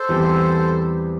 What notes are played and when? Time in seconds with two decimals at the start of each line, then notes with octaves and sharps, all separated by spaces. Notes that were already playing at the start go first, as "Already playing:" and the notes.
Already playing: A4 C5
0.09 E2 E3 G3 C4 G4